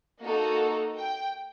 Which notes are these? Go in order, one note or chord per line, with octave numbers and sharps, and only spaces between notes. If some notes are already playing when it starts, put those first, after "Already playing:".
A#3 D#4 F#4 A4
G5